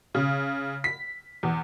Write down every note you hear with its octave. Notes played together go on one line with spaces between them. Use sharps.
C#3
B6
E2